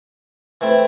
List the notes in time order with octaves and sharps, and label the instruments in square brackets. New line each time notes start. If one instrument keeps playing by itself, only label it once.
[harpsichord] E3 A3 C4 E4